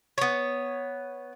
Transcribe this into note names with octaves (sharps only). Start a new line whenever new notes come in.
B3 C#5